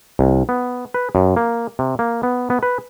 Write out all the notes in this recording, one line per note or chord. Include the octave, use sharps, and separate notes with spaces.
C2
B3
B4
F#2
A#3
C3
A#3
B3
B3
B4